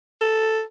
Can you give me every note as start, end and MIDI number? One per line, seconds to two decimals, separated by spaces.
0.21 0.61 69